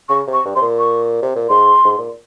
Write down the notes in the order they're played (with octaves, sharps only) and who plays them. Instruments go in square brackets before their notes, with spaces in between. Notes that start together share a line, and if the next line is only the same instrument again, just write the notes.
[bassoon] C#3 [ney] C#6
[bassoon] C3
[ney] C#6
[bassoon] G2
[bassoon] C3 [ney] C6
[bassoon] A#2
[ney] C#6
[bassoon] C3
A#2
[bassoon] G#2 [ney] C6
[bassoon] G#2
A#2